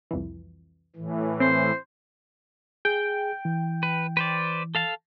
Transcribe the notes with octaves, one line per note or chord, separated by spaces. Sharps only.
C2 F2 E3
A2 E3
C4 C5
G#4 G5
E3
B4
B4 C5 D5
A4 F5 A5